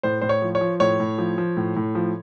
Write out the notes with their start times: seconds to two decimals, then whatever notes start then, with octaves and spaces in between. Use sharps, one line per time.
0.03 A2 C5
0.22 A2 C5
0.29 C#5
0.42 F3
0.55 C#5
0.61 F3
0.80 A2 C#5
1.00 A2
1.18 F3
1.38 F3
1.57 A2
1.76 A2
1.95 F3